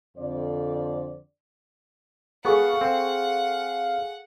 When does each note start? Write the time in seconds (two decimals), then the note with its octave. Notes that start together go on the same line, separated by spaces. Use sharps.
0.17 F2 D3 C4 C5 D5
2.45 B3 G#4 A4 F5 F#5 C#6
2.81 C4